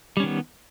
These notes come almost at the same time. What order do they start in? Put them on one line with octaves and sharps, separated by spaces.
G3 C#4 D#3 B3